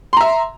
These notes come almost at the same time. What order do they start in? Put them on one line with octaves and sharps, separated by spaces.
C6 A#5 E5